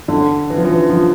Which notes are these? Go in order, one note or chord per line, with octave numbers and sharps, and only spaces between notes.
D3
E3
F3
E3
F3